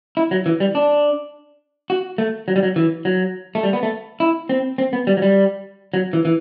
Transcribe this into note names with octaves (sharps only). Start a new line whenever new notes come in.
E4
F#3
E3
G3
D4
F#4
A3
F#3
G3
F#3
E3
F#3
A3
G3
B3
A3
E4
C4
C4
B3
G3
F#3
G3
F#3
E3
E3